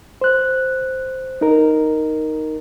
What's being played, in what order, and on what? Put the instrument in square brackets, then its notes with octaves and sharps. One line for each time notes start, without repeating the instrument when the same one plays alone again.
[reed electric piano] C5 F#6
D#4 A#4